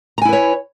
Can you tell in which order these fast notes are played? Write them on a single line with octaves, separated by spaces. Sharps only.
A#5 G#5 E4 B4 C#5